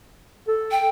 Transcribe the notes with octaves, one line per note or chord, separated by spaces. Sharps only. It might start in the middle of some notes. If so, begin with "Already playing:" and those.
A4
G5